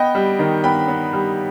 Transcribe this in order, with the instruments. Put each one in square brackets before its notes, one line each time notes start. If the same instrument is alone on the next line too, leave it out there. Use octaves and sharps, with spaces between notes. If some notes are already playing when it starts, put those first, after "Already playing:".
Already playing: [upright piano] B3 D#5 G5
G3
D#3
B3 G5 B5
B3
G3